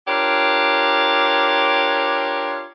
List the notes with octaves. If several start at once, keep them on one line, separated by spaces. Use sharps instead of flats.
D4 F4 G4 A#4 C#5